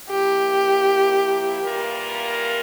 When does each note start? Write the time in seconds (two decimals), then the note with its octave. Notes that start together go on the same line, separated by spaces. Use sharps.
0.10 F3 A#3 E4 G4
1.62 E3 G3 A#3 F4 A#4